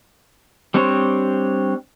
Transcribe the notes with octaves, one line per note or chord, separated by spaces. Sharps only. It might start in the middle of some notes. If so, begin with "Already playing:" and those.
G3 C4 D4 C5 C#5